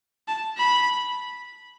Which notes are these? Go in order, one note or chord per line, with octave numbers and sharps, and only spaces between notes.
A5
B5